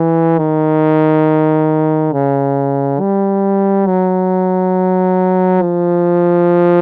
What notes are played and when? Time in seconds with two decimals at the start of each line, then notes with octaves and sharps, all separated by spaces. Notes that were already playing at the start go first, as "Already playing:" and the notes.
Already playing: E3
0.38 D#3
2.12 C#3
3.00 G3
3.87 F#3
5.62 F3